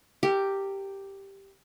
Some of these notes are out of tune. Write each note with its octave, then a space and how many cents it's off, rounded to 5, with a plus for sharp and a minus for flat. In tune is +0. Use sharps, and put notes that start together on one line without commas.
G4 +0 A#4 -35